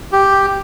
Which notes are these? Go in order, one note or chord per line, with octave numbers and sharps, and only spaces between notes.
G4